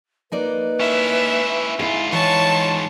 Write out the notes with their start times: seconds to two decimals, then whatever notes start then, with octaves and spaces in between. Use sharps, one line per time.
0.32 A#3 D#4 B4 D5
0.80 C#4 E4 E5
1.79 G#2 E4 F4 G#4
2.12 E3 C#5 A5 C#6